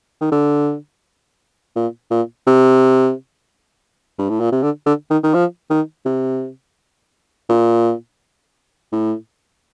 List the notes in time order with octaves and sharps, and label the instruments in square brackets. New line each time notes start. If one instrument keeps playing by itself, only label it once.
[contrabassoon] D#3
D3
A#2
A#2
C3
G2
A2
A#2
C3
D3
D3
D#3
D#3
F3
D#3
C3
A#2
A2